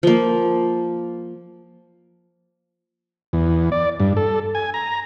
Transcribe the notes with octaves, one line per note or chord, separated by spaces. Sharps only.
F3 A#3
E2
D5
G2
A4
G#5
A#5